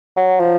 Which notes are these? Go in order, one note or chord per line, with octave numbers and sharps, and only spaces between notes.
F#3
F3